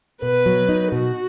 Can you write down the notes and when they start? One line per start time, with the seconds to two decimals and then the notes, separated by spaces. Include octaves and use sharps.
0.22 B2 B4
0.46 F#3
0.69 D#4
0.92 B2 F#4